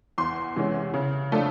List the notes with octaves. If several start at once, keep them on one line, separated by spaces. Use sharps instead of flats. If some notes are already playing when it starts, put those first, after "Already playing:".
E2 C6
C3 E3 G#3 C#4
C#3
F3 A3 D4